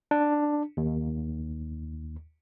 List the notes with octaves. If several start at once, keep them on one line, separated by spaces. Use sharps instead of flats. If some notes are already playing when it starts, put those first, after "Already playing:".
D4
D#2